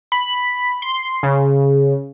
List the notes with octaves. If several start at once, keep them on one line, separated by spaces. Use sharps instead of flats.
B5
C6
C#3